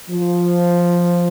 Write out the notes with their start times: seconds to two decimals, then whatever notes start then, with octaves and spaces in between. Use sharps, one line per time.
0.10 F3